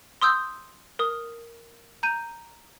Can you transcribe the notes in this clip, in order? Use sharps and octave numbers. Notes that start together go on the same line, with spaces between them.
C6 D#6 E6 G6
A#4 D#6
A#5 G6 D#7